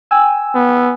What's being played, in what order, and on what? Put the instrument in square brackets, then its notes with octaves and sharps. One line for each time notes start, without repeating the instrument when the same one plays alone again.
[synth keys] G5 G#5 E6
[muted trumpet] B3